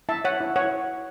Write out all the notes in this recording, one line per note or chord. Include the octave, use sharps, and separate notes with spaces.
E4 E5 A5
C#5 F#5
E4
C#5 F#5